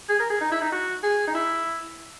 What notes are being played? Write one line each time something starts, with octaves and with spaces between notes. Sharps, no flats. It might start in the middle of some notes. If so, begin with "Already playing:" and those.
G#4
A#4
G#4
D#4
E4
D#4
F#4
G#4
D#4
E4